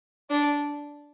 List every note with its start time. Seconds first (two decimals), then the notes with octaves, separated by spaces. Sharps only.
0.29 D4 D5